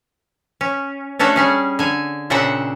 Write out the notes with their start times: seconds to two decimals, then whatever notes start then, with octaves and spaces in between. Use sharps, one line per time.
0.61 C#4
1.19 A3 C#4 D4 F#4 A4
1.36 G3 C#4 G#4
1.79 D3 G#5
2.30 A#2 C#3 C4 D4 E5 F#5